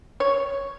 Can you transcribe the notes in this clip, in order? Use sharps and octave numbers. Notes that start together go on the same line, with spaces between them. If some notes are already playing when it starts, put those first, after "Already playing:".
C#5